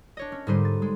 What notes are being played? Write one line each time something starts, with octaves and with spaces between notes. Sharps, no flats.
D4 C#5 D#5
C#4
G#2 D3 G3 D#4 C5 D#7
A6
G#3